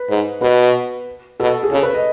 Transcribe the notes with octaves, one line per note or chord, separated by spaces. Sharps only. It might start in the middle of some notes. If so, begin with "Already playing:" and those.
Already playing: B4
G#2
B2 B4
B2 A4
G#4
C#3 A4
B4
D#5